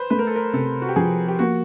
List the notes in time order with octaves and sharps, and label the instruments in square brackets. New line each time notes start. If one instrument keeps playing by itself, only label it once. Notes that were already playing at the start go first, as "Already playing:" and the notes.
Already playing: [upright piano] B4 C5
[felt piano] A3 [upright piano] B4
[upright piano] A#4
A4
A#4
[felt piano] C3 [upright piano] A4
[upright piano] F#4
G4
[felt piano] F3 [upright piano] G#4
[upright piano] G4
[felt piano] A#3 [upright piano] F#4